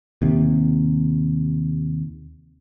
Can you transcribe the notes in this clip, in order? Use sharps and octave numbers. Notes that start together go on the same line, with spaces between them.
D#2 C3